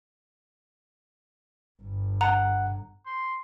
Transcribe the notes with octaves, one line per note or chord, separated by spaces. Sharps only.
G1 G2
F#5 A#5
C6